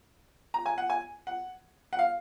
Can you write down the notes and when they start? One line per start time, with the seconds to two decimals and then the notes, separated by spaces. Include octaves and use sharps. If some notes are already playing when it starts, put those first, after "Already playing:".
0.54 A#5
0.66 G#5
0.78 F#5
0.90 G#5
1.27 F#5
1.93 F#5
1.99 F5